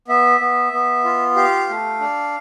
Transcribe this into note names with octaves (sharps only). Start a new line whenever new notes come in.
B3 E5
B3
B3
F4
G4 F5
A3
D4